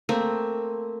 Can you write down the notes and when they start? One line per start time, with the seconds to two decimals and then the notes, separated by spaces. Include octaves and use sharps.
0.09 A3 A#3 C4